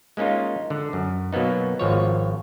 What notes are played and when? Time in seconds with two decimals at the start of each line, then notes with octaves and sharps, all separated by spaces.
0.17 G#3 A#3 C#4 D#4 F4
0.70 D3
0.93 F#2
1.33 B2 F#3 A#3 B3 D#4
1.79 G#1 F3 C#5